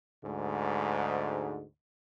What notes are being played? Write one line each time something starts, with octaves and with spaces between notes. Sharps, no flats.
D2 G#2